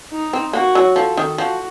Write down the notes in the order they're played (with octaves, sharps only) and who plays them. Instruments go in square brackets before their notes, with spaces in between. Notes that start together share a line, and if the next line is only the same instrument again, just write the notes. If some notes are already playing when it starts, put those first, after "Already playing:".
[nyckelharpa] D#4
[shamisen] C4
[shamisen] A#3 [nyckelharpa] F#4
[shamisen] F#3
[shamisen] F3 [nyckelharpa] A4
[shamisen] D#3
[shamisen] F3 [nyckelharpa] F#4